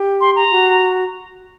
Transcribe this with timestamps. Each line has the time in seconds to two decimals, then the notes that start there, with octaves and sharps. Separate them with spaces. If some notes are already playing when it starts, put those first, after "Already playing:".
Already playing: G4
0.21 C6
0.36 A#5
0.51 F#4